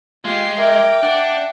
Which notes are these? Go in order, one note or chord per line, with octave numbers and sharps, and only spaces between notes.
G#3 F4 G4 C7
A#4 E5 G5 D6
D4 F#5